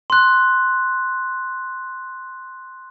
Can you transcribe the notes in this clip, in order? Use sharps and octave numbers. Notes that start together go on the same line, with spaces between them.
C6 F#6